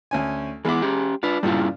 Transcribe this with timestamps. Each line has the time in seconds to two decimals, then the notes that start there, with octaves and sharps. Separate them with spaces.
0.11 D2 C#4 G#5
0.65 E3 G#3 B3 E4 D6
0.82 C#4 G4
1.23 D4 F4 B4
1.43 G2 A#2 C#3 G3 C#4 E4